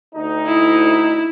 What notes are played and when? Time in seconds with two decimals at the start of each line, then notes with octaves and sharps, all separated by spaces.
0.15 D2 D#4
0.47 E4